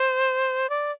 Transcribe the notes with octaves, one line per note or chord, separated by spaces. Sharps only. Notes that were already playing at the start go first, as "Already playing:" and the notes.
Already playing: C5
D5